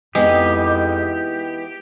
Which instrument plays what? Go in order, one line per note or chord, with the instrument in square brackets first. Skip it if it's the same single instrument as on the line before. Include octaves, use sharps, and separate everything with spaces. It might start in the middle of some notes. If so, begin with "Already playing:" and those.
[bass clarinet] F2 [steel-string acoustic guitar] E3 B3 D#4 [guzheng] G#3 [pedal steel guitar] G4